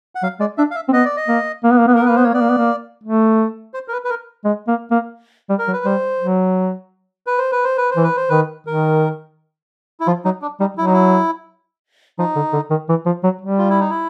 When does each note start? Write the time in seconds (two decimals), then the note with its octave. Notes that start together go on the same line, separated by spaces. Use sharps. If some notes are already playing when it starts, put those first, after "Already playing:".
0.15 F#5
0.23 F#3 F5
0.40 G#3 D5
0.57 D4 E5
0.71 F5
0.75 E5
0.89 C4
0.92 B3 D#5
1.05 D5
1.17 D#5
1.28 A#3
1.64 A#3
1.72 B3
1.79 A#3
1.88 B3
1.95 A#3 A#4
2.03 B3
2.06 B4
2.10 A#3
2.16 B3 C5
2.24 A#3 C#5
2.34 B3 D5
2.42 A#3
2.50 B3
2.57 A#3
3.04 A3
3.74 C5
3.88 A#4
3.92 B4
4.05 B4
4.09 A#4
4.45 G#3
4.68 A#3
4.91 A#3
5.50 G3
5.59 A#4
5.68 F#3
5.73 B4
5.85 G3 C5
6.20 F#3
7.27 B4
7.38 C5
7.52 B4
7.64 C5
7.77 B4
7.91 C5
7.97 E3
8.04 B4
8.17 C5
8.29 D#3 B4
8.67 D#3 A#4
10.00 E4
10.07 F3 F4
10.25 F#3 D#4
10.42 D4
10.60 G3 D#4
10.77 F#3 E4
10.86 D#4
10.93 E4
12.19 F3 D#4
12.36 D3
12.53 D3
12.71 D#3
12.89 E3
13.06 F3
13.24 F#3
13.41 G3
13.58 F4
13.70 E4
13.80 D#4
13.90 E4